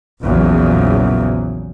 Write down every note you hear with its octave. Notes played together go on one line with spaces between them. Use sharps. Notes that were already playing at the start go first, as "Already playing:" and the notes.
A#1 E2 C#3 F#3